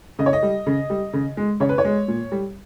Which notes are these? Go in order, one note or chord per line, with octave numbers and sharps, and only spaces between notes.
C#3 D#5
C#5
D#5
G3
C#3
G3
C#3
G#3
C#3 C#5
B4
C#5
G#3
A#2
G3